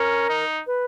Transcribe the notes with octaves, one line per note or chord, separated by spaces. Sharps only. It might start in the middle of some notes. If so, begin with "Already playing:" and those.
Already playing: C#4 A#4
D#4
B4